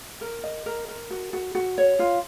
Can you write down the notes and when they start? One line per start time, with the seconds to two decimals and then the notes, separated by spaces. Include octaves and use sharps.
0.21 A#4
0.44 D#5
0.66 A#4
0.88 A#4
1.11 F#4
1.33 F#4
1.55 F#4
1.78 C#5
1.99 F4